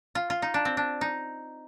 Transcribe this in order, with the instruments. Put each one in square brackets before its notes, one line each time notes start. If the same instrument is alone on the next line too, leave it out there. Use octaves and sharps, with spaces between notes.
[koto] F4
F4
D#4
D4
C4
D4
D#4